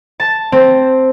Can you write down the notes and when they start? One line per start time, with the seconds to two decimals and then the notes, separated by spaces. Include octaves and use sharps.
0.20 A5
0.52 C4